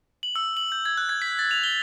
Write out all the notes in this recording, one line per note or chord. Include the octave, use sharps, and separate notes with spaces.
F#7
E6
F#7
G6
G#6
F#6
G#6
B6
A6
F7
G7